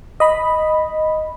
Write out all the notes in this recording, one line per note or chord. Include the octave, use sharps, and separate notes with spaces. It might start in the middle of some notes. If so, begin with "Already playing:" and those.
D#5 B5